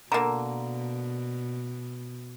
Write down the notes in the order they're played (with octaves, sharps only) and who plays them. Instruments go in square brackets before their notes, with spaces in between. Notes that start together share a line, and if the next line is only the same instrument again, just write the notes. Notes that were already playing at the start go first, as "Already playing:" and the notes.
[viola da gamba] B2 [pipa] D3 A#3 [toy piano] A#5